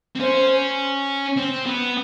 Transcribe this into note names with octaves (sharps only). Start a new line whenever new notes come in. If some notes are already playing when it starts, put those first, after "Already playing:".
C4
C#4 C5
C4
B3